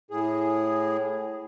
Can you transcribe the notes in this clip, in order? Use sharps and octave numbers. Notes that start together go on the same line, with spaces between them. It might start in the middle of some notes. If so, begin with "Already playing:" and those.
A2 G#4